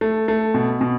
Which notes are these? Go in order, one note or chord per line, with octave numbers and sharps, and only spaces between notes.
A3
A3
B2
B2